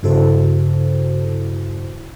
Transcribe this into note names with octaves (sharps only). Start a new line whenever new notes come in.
G2 C#3 E4 F#4 A4 C5